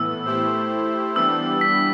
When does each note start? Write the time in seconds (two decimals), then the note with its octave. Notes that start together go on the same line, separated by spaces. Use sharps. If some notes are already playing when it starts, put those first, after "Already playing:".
Already playing: A2 E3 B3 E6
0.26 A3 E4 G4 C5
1.16 E3 G3 B3 D4 G4 E6
1.61 B6